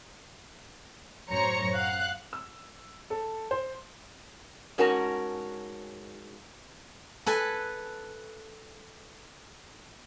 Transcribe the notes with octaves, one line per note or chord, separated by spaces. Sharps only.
F#2 A2 C5 C#5 A#5 C#7
F5 F#5 F#6
E6
A4
C5
G#2 C#4 F#4 A#4 C#5 A5
A4 B4 G#5